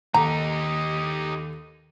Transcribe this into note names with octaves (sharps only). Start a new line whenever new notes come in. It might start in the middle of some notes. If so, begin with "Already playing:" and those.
D#2 D#4 G4 A4 A#5